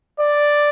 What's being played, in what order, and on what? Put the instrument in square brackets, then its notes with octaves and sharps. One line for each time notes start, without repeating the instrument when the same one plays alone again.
[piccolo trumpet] D5